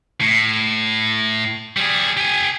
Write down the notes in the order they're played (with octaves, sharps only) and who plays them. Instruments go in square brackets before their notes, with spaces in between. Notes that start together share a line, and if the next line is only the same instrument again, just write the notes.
[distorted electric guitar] A2
G3 G#4
G4 G#5